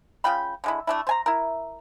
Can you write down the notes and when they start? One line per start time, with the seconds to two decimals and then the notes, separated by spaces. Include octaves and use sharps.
0.24 C#3 F4 G5 B5
0.64 D3 G#3 E4
0.87 A3 D4 E4
1.07 C5 G#5 A#5
1.26 E4 A#4